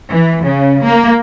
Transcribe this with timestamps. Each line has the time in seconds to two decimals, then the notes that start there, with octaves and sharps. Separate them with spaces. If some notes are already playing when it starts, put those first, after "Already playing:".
0.13 E3
0.45 C#3
0.83 A#3